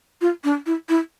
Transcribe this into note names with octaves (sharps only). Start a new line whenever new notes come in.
F4
D4
E4
E4